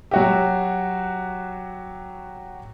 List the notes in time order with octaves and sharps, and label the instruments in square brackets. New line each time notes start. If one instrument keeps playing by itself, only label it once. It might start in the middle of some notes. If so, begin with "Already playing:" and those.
[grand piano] F#3 F#4 G4